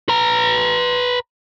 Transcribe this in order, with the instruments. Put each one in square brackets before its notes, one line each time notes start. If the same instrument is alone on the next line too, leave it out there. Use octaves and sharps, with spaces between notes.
[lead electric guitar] B4 A#5